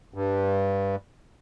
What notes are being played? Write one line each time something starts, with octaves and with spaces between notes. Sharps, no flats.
G2